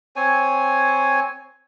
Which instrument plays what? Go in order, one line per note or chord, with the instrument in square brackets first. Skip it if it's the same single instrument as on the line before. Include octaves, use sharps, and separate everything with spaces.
[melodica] C4 C#5 G#5